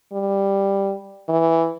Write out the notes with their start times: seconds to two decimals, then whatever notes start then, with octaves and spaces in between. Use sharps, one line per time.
0.13 G3
1.29 E3